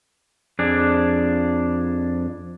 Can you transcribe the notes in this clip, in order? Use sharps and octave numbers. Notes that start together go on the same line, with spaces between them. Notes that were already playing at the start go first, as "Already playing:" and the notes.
F2 D4 G#4